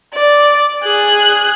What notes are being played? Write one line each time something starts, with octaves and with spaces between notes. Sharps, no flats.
D5
G#4 F#6